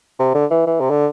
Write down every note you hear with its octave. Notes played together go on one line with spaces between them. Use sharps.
C3
D3
E3
E3
C3
D3